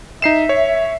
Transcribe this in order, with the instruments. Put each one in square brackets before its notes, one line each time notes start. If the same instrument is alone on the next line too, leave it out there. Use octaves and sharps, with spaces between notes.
[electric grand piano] D#4 C7 E7 [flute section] E5
[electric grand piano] C#5